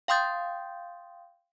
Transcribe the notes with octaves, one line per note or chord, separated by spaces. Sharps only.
F5 G5 C6 D#6 G6 A6